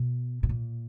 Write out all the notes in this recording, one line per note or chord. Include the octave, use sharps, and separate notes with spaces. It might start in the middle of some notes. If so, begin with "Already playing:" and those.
Already playing: B2
B2
A#2